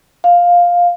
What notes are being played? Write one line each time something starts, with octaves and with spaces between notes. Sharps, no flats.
F5